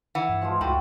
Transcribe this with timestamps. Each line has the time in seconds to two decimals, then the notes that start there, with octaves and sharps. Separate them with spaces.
0.15 E3 F#5
0.29 G2
0.42 F3 G#3 F4
0.61 C#2 A2 F#4 G5 B5